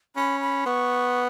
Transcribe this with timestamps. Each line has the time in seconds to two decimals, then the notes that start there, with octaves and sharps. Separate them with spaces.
0.16 C#4 B5
0.41 B5
0.66 B3 C#6